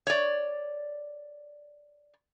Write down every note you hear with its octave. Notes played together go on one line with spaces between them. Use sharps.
C#5 D5